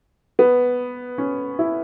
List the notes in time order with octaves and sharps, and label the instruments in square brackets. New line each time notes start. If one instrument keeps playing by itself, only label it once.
[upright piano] B3
C#4
E4